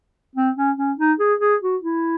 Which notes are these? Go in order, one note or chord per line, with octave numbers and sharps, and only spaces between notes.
C4
C#4
C#4
D#4
G#4
G#4
F#4
E4